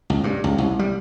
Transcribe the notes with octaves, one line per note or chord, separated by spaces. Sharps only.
C#2
G2
C#2
C2
G3